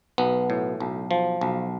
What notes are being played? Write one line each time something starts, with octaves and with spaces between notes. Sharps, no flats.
B1 B3
A2
B1
F3
B1